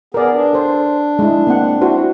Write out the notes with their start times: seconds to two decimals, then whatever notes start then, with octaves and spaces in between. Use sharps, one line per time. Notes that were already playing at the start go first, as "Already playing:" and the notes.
0.14 B3 G#4 A#4 D5
0.32 D4
0.53 A4 C5
1.19 G#3 E4
1.47 A#3 C4 F#5
1.81 E4 F#4 C5